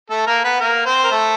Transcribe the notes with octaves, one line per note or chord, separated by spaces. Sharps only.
A3 A4
A#3 A#4
B3 B4
A#3 A#4
C4 C5
A#4
A3 A4